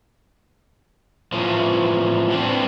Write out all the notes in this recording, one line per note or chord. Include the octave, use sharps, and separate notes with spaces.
A2 E3 F3
A2 B3 C4 D4